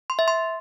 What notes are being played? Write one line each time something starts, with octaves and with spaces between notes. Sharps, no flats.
C6
E5
C6